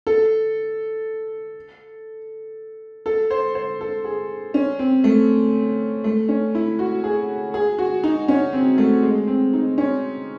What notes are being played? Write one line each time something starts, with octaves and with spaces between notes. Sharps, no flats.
A4
A4
C5
C5
A4
G#4
C#4
C4
A3
A3
C#4
E4
F#4
G#4
G#4
F#4
D#4
C#4
C4
A3
G#3
C4
D#4
C#4